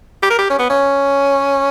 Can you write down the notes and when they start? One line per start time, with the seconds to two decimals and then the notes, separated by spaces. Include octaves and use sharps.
0.23 G4
0.30 A#4
0.38 G4
0.50 C#4
0.59 B3
0.70 C#4